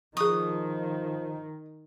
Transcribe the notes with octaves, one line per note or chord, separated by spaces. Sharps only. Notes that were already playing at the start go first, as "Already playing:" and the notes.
D#3 F3 G#4 C#6 D#6